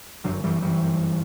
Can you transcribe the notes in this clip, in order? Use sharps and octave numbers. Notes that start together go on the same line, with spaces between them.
G1 F#2 D3 F#3
E3 G3
E3 G3